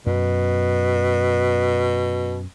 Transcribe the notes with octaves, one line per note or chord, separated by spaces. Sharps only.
F#2 B2